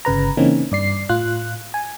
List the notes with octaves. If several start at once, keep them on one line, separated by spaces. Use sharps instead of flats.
G1 C#3 B4 A#5
C#3 E3 A#3 C4 C#4 D#4
G2 D5 C7
A2 F4 F#6
G#5